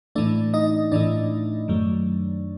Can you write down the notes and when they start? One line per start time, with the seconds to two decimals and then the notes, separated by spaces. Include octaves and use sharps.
0.15 A2 E3 A3 D4 D5
0.54 D#4 D#5
0.92 A2 E3 A3 D4 D5
1.68 F#2 D#3 F#3 A3